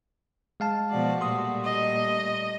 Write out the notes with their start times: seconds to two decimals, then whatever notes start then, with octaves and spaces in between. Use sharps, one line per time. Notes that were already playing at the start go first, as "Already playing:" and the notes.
0.60 G#3 F5 A5
0.90 B2 F3 F#4 D5
1.21 A#2 G3 A3 C6 D#6
1.65 D#5